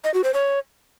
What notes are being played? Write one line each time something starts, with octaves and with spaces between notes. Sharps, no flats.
D#5
F#4
C5
C#5